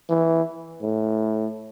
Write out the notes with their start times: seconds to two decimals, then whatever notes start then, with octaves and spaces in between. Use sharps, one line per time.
0.09 E3
0.82 A2